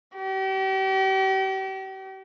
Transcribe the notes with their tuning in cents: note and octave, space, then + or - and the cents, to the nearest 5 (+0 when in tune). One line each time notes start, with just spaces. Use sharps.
G4 -40